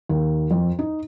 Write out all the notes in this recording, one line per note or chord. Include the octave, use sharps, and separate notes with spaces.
D#2
F2
D#4